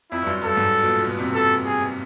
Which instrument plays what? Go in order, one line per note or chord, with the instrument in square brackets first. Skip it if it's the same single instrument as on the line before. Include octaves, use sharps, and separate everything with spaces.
[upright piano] F2 [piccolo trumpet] E4
[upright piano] G2
F#2
[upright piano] G2 [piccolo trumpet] A4
[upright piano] G#2
B2
A#2
B2
C3
[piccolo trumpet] A4
G#4